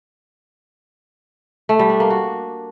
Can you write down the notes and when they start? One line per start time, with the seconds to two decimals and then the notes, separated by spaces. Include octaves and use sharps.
1.69 A3
1.79 G3
1.90 D4
2.00 A#3
2.10 F#4